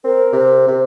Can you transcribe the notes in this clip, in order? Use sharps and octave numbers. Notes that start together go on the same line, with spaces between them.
C4 A#4
C3
C3